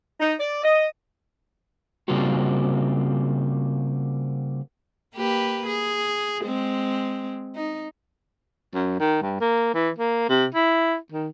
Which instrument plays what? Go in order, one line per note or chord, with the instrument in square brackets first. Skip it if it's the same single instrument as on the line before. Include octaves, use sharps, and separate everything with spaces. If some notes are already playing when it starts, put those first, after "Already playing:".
[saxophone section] D#4
D5
D#5
[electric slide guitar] C#3 G3 A#3 C4 F4 F#4
[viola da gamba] A#3 G4 B4
G#4
G#3 C4
D#4
[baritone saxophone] F#2
D#3
G2
A#3
E3
A#3
C3
E4
D#3